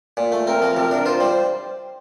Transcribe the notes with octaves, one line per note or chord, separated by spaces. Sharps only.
A#2
A3
C4 A#4
F3
C3 A#4
D4
F4 C5
G3